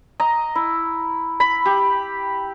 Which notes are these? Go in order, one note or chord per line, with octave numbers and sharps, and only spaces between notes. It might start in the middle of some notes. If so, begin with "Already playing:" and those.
D#5 A#5
E4
B5
G4